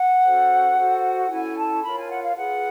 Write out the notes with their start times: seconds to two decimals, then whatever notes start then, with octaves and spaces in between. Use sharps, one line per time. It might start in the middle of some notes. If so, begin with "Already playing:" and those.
Already playing: F#5
0.24 C#4 F#4 A4 C5
0.76 F#4 A4 C5
1.29 C#4 E4 A4 G#5
1.57 A5
1.82 F4 A#4 C#5 B5
1.96 G#5
2.09 F#5
2.22 F5
2.36 F4 G#4 B4 F#5